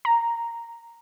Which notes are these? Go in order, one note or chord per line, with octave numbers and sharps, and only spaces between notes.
A#5